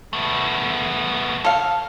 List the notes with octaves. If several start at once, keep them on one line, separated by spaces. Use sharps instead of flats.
A3 B3
A4 F5